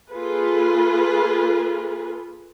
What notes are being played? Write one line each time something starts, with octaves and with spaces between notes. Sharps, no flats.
A#3 F4 G#4 A4 B4